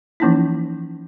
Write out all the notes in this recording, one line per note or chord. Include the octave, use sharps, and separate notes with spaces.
E3 F3 A#3 C#4 D#4 E4